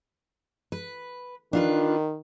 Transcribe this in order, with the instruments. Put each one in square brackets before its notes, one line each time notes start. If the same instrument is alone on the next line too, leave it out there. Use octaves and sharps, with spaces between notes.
[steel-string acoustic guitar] B4
[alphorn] D#3 [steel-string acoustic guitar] D4 F4 B4